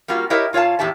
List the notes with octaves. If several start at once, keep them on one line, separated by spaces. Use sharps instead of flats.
G3 A#3 C#4 F4 F#4
E4 G4 A#4 C#5 D#5 E5
G#2 F4 C#5 F5 A5
E2 A2 G4 E5 A5